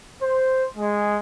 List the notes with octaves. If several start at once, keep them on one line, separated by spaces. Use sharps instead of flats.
C5
G#3